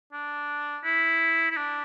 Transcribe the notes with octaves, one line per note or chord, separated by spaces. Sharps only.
D4
E4
E4
D4